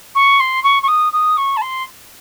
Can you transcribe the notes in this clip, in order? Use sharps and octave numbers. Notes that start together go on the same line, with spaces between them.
C#6
C6
C#6
C#6
D#6
D#6
C#6
A5
C6